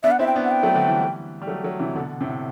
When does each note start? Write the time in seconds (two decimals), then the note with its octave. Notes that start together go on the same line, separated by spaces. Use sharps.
0.03 B3 D4 E5
0.11 F#5
0.19 C4 E4 E5
0.27 G5
0.35 B3 D4
0.45 F#5
0.51 G5
0.63 F#3 A3
0.75 D3 F#3
0.88 E3 G3
1.42 G3
1.47 F#3 A3
1.64 F#3 A3
1.79 C3 E3
1.95 B2 D3
2.20 A2 C3